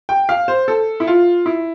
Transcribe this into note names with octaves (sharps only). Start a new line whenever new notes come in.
G5
F5
C5
A4
E4
F4
E4